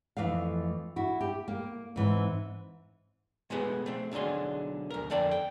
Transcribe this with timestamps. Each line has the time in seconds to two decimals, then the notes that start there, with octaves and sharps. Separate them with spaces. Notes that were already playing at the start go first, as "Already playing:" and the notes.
0.17 F2 E3 A3 F5
0.96 E4 F#4
1.21 G4
1.48 A#3
1.96 G#2 E3 C4 E4
3.50 B2 G#3 A3 B3 F#5
3.86 A3 C4
4.12 B1 D3 F#3 G#4 C6
4.90 D2 A#4
5.10 F2 D3 A4 D5 G5 A5
5.31 G5